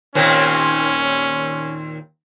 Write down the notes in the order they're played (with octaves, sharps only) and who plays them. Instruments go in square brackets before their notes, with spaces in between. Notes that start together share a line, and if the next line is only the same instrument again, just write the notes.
[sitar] D#2 A#2 C4 [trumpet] C#4